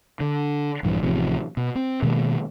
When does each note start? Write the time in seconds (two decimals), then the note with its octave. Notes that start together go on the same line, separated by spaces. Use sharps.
0.20 D3
0.83 A#1 G2 E3
1.03 A1 C3 F3
1.57 B2
1.75 C4
2.02 B2 D#3 G#3 A#3